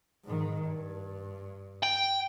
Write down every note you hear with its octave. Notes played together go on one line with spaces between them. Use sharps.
G#2 D#3
G2
G5